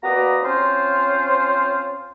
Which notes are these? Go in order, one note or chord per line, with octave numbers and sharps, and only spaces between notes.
A#3 F#4 B4 D5 D#5 A#5
C4 C#4 F4 C5